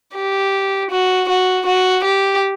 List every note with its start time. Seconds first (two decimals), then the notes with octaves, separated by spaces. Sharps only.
0.15 G4
0.91 F#4
1.29 F#4
1.66 F#4
2.04 G4